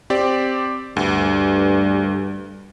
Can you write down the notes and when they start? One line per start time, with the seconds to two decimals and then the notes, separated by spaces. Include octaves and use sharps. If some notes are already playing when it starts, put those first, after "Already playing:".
0.10 C4 G4 D5
0.96 D2 G2